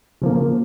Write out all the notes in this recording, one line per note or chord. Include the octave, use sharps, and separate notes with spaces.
C#3 F3 A#3